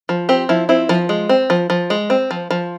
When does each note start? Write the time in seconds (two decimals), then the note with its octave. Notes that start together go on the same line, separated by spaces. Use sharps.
0.09 F3
0.29 C4 G4
0.49 F3 E4
0.69 C4 E4
0.89 F3
1.09 G#3
1.29 C4
1.50 F3
1.70 F3
1.90 G#3
2.10 C4
2.31 F3
2.51 F3